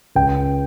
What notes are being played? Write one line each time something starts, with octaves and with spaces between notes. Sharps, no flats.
C#2 G5